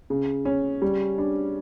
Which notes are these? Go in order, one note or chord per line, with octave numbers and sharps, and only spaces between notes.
C#3
C#4
G3
D4